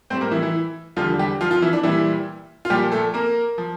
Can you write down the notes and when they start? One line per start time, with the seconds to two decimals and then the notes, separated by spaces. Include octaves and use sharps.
0.10 A2 G3 C4 C5
0.21 A#3 A#4
0.31 E3 E4
0.42 E3 E4
0.96 E2 D3 F3 G3 F4
1.19 G3 G4
1.41 F3 F4
1.51 F3 F4
1.62 E3 E4
1.73 D4
1.83 A#2 E3 G3 E4
2.65 F4
2.70 A#2 F3 G3 G4
2.92 A3 A4
3.14 A#3 A#4
3.58 F3